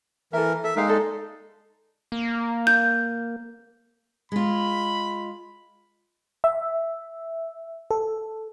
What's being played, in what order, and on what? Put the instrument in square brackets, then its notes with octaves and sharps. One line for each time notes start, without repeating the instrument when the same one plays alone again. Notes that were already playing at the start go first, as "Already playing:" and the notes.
[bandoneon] E3 A#4 [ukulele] A4 E5
[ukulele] A4 [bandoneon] E5
[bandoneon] G#3 D#4 [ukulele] A#4 F5 G5
[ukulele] A4 D5
[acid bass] A#3
[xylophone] G6
[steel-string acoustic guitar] G#3 F4 [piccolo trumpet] B5
[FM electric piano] E5
A4